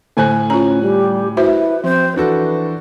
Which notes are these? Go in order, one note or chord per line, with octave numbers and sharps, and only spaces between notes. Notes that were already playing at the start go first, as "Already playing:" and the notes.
A2 D3 C5 G#5 F#6
C#4 F4 A#5
G3 G4
E4 F#4 B4 C5 E5
F3 C4 C5
E3 D4 F#4 A4 B4